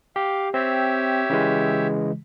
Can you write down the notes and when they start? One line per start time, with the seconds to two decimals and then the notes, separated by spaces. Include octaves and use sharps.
0.16 G4 F5
0.54 C4 G4 C#5 E5
1.30 C#3 E3 G#3